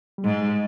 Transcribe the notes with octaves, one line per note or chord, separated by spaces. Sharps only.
G3
G#2 G#3